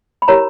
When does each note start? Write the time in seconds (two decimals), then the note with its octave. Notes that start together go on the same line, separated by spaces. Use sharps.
0.22 B5
0.28 E4 G4 A#4 C#5 A#5